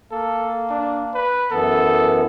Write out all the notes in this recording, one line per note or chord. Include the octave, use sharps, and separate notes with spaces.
A#3 A4
D4
B4
F#2 E3 B3 A4